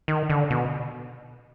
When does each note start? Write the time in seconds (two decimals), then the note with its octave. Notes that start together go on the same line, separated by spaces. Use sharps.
0.08 D#3
0.30 D3
0.50 B2